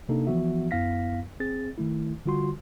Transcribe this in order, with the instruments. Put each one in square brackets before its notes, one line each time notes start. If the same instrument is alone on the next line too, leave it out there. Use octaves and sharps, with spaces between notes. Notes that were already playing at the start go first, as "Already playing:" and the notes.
[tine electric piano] C3 A#3 D4 D#4 A4
E3 F3 B3 F#4 E5
F#2 B3 E4 F5 A#6 B6
C4 G#4 A6
D#3 A3 E4
D3 G3 F4 F#4 C6